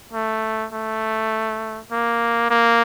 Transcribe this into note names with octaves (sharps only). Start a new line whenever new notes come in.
A3
A3
A#3
A#3